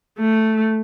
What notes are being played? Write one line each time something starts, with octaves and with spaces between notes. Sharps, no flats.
A3